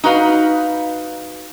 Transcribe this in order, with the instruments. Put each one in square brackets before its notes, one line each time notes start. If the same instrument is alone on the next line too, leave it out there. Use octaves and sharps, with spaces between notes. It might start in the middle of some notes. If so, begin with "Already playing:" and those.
[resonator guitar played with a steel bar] D#4 F#4 B4 F5